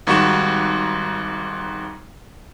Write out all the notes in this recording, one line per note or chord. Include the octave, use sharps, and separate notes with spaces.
G#1 G#2 G3 F#4 C#6 E7